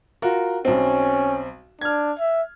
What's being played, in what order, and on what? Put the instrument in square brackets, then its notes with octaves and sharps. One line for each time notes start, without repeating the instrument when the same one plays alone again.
[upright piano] F4 F#4 A#4
[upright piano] B1 C4 [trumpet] C#4
[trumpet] D4 [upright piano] F6 G#6
[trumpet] E5